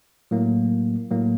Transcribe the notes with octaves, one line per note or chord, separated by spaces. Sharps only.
A2 F#3 A#3
A2 F#3 A#3